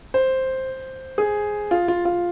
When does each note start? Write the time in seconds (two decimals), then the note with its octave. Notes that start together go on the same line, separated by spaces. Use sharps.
0.14 C5
1.18 G#4
1.71 F4
1.88 F4
2.05 F4